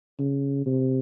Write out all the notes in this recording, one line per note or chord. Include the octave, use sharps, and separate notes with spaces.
C#3
C3